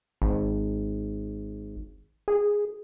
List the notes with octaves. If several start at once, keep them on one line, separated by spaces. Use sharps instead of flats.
G#1
G#4